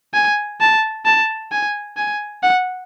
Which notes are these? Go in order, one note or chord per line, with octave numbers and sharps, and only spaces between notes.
G#5
A5
A5
G#5
G#5
F#5